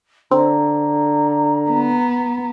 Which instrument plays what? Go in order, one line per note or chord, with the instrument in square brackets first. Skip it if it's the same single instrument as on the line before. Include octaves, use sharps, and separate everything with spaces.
[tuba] D3 [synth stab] C4 [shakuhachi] A#5
[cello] B3